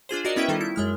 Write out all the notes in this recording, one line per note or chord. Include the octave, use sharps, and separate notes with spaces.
D4 F4 G#4 C5
F#4 G#4 A#4 D5 D#5
B3 C#4 E4 B4 E5 G5
D#3 G3 D#4 F4 A4
E4
F#2 G#3 F6